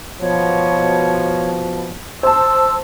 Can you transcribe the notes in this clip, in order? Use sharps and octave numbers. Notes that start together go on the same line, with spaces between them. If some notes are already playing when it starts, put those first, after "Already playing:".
B2 F3 C#5
C5 A5 E6